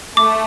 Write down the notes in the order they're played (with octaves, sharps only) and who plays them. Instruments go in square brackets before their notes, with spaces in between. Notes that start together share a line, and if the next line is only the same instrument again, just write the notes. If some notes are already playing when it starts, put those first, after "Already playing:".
[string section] A3 [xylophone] D6